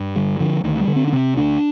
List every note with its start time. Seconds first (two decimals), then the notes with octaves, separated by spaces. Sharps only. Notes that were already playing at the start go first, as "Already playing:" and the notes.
Already playing: G2
0.16 D3 G3
0.40 D3 F3
0.64 D2 D#3
0.80 G3
0.88 D3
0.96 C4
1.07 D4
1.12 C3 C4
1.36 D2 D4